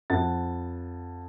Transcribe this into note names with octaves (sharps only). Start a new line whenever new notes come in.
F2 F#5 A6